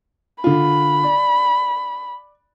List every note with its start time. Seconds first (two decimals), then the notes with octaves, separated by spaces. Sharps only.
0.44 D3 F4 B5
1.03 D5